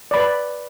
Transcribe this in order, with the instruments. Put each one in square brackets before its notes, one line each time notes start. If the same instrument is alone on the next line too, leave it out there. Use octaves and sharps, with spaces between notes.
[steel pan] D5
B5
B4